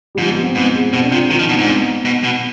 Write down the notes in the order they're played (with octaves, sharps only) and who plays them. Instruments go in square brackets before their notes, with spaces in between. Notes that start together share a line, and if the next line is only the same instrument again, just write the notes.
[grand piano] G3
[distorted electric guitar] G#2 [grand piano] F3
[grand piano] B3
C4
[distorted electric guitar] G#2 [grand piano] B3
[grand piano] G#3
[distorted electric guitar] B2 [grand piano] C4
[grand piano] D4
[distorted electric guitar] C3 [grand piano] F4
[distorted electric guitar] D#3 [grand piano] F4
[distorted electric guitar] F3 [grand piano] D#4
[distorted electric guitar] B2 [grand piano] D4
[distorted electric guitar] G#2 [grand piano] C4
[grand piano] B3
[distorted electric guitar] B2
B2